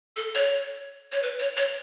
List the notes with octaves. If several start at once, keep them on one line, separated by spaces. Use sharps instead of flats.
A4
C#5
C#5
B4
C#5
C#5